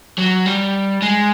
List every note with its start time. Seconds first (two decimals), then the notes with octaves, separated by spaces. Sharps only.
0.18 F#3
0.46 G3
1.02 G#3